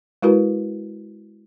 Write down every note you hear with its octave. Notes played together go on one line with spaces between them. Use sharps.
G#3 E4 F#4 A#4 B4